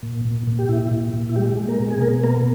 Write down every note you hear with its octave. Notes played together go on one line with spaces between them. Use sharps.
A#2
A#2
A#2
G4
A#2 E4
A#2
A#2
E4
G3 G#3 G4
G#3
A#3 A#4
B2
G#4
B2 A#3 A#4
A#3 B3 A#4